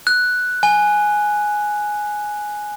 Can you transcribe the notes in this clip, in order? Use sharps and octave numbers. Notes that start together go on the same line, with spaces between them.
F#6
G#5